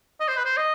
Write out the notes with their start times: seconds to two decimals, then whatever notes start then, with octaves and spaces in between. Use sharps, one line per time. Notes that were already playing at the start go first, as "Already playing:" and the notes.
0.20 D#5
0.28 C5
0.37 B4
0.45 C5
0.57 D#5